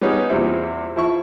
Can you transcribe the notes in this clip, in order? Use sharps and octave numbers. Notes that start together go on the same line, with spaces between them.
G3 B3 C#4 D#4 G#4
E2 A#2 G3 C4 E4
F3 E4 C#6